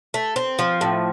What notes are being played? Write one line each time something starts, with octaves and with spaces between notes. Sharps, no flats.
A3
C4
F3
A2